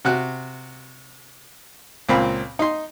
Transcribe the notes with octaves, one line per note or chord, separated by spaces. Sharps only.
C3 F#4 F#6
C#2 A#2 C4 F5 B5
D#4 C6